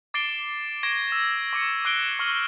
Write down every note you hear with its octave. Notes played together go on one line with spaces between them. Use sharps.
D6 A6 C7 D7 G7
C#6 G#6 A#6 D7 E7 G7
E6
C#6 D6 C#7
D6 F#6 C7 D7 G7
C#6 F6 F#7 G7